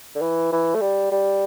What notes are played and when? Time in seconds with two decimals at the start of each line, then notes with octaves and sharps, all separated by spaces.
0.15 D3
0.21 E3
0.52 E3
0.75 A3
0.81 G3
1.11 G3